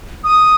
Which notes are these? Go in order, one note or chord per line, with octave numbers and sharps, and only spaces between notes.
D#6